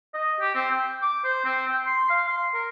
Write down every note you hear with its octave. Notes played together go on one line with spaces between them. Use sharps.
D#5
G4
C4
G5
D6
C5
C4
G5
C6
F5
C6
A#4